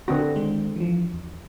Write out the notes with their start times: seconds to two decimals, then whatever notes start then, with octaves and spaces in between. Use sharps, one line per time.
0.08 D3 C4 F#4 A#6
0.35 D#3 G#3 C5
0.76 E3 F3
1.14 E2